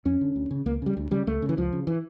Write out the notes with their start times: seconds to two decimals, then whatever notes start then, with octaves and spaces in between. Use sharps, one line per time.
0.05 F2 C#4
0.21 D3
0.36 D2
0.51 C#3
0.66 C#2 A#3
0.82 C#3 G3
0.97 D2
1.11 C#3 G3
1.27 C#2 A3
1.42 C#3
1.49 E3
1.57 C#2 F3
1.73 C#3
1.87 E3